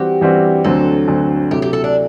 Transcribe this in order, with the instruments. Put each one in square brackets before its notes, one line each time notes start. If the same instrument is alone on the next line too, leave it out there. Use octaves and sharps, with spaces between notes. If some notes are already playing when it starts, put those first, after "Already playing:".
Already playing: [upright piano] E3 G3 C4 F#4 [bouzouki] G4
[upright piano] E3 G3 C4 F#4
[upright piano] D2 D3 F#3 C4 [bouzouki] A4
[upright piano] D2 D3 F#3 C4
[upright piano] C3 F#3 A3 E4 [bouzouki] G4
[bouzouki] G4
A4
D4